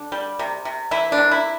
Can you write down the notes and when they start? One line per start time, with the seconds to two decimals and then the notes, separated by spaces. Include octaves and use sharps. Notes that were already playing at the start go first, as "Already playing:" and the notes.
Already playing: D3
0.12 G3
0.39 C3
0.65 C3
0.91 E3 E4
1.12 D4
1.18 C3
1.31 E4